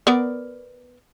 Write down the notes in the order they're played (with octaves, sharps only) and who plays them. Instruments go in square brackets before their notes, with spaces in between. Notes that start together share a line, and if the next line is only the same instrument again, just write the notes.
[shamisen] B3 A#4 D5